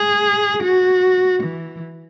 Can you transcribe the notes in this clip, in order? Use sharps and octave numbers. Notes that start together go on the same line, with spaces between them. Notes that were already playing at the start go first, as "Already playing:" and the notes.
Already playing: G#4
F#4
E3